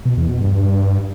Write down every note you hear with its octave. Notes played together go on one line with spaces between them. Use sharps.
B2
E2
B2
G2